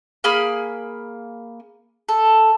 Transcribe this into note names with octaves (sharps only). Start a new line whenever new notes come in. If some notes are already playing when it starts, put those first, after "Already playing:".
A#3 G#4 B5 F6
A4